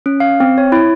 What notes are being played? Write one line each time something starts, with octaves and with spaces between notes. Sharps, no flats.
C#4
F5
C4
C#5
E4